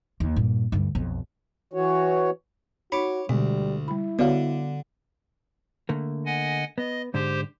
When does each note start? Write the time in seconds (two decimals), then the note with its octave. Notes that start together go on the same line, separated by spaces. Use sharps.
0.20 D#2
0.36 G2 A#2
0.72 D2 G2
0.95 B1 F2
1.73 E3 F#4 C#5
2.92 D#4 F#4 C#5 B5 D6
3.29 D2 B2 G3 G#3
3.88 G3 E4 B5
4.19 D3 B3 F#4 G4 C#5 D5 F5
5.89 D3 A3 A#3
6.26 D#5 F#5 G#5
6.78 B3 D#5
7.14 G#2 D3 G4 C5